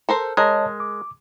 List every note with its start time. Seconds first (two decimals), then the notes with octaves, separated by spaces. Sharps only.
0.09 A4 A#4 C5
0.37 G#3 A#4 C#5 D#5 A5
0.80 D6